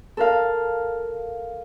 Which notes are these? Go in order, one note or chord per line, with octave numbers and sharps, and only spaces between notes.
A4 A#4 F5